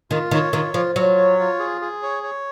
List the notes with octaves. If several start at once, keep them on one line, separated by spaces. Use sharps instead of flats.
D#3 F4
D#3 C#5
D#3 F4
F3 F4
F#3 F4
C#5
F4
G#4
G#4
C#5
C#5